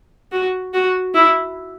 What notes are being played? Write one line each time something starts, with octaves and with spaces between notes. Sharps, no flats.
F#4
F#4
E4